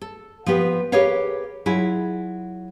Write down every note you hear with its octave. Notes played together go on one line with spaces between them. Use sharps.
A4
F3 B3 G4 B4
G4 G#4 A#4 B4 C#5 F5
F#3 E4 F4 G#4